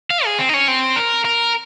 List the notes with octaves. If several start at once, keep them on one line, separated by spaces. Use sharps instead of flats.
F5
G#4
C4
D#4
C#4
C4
A#4
A#4